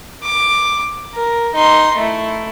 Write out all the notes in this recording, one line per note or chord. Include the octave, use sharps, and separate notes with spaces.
D6
A#4
D#4 C6
A3 E4